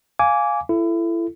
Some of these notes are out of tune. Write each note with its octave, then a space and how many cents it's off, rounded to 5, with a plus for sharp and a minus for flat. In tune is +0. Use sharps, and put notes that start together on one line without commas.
F5 +0 G#5 +0 D6 -20
E4 +30 A4 +0